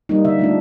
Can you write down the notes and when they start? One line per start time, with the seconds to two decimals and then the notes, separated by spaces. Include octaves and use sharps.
0.09 G3 A#3 D#4
0.25 D3 E5
0.39 F3 A3 D4